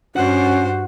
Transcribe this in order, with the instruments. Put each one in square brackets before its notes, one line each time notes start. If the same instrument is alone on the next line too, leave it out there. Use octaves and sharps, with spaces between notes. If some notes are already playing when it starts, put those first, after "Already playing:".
[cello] G2 C5 [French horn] C#4 [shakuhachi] F#4 [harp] F#5 F#6